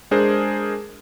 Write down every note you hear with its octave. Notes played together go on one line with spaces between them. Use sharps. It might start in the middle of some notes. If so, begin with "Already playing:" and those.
G#3 D4 G#4 A#4 C5